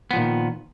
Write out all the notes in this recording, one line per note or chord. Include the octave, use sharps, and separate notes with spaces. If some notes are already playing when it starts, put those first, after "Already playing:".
A#2 D#3 F3 B3